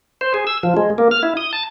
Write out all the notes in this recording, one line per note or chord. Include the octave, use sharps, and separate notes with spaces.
C5
G#4
E6
F3
G#3
A#3
F6
E4
D#6
A5